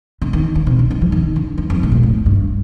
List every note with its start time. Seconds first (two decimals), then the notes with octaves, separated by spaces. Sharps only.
0.22 D3
0.33 D#3
0.55 D#3
0.67 C3
0.79 D3
0.91 D#3
1.02 F3
1.12 D#3
1.36 D3
1.58 D#3
1.70 F2
1.83 A2
1.92 A#2
2.03 A2
2.26 G2